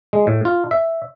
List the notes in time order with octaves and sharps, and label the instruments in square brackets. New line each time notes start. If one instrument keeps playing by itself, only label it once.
[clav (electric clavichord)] G#3
A2
F4
E5